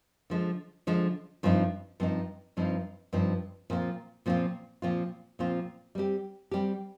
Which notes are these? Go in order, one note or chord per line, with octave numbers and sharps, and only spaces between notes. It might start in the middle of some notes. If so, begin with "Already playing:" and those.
D3 F3 G#3
D3 F3 G#3
G2 F3 C4 D#4
G2 F3 C4 D#4
G2 F3 C4 D#4
G2 F3 C4 D#4
A#2 F3 C4 F4
A#2 F3 C4 F4
A#2 F3 C4 F4
A#2 F3 C4 F4
G3 C4 G4
G3 C4 G4